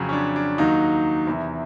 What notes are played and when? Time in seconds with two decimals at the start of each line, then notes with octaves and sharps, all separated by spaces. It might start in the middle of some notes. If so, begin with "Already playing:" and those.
Already playing: F2 C#3 F#3
0.09 C#4
0.13 D4
0.36 D4
0.58 D#2 D#3 F#3 D#4
1.27 E2 C3 E3